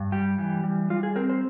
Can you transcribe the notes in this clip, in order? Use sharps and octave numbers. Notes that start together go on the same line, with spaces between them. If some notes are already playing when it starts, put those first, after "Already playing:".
Already playing: G2
G3 G4
E3
G3
G3 F4
G#4
C4 A#4
C5